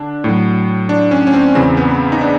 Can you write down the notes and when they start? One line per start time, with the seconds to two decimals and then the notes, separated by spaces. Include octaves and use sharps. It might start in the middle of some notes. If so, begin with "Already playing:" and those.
Already playing: D3 D4
0.24 A2 F#3
0.89 D4
1.11 C#4
1.27 C#4
1.33 C4
1.55 E2 C#3 E3 C4
1.77 B3
2.12 D#4
2.21 D4